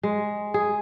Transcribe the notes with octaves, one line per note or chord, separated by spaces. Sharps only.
G#3
G#4